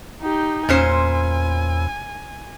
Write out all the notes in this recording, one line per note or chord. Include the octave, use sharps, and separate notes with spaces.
D#4 G4
E2 A#2 C#4 C5 G#5